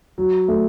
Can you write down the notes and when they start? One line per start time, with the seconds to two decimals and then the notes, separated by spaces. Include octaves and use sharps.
0.18 F#3
0.48 A3